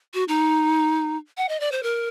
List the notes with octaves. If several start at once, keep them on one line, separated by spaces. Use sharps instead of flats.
F#4
D#4
F#5
D#5
D5
C5
A#4